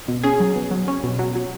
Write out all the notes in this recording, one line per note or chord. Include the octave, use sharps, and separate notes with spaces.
B2
C#4 G#4
F#3
B2
F#3
C#4
B2
F#3
F#3